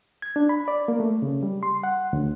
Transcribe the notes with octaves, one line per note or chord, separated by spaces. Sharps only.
G#6
D4
B5
D5
A#3
A3
C#3
G3
C6
F#5
D2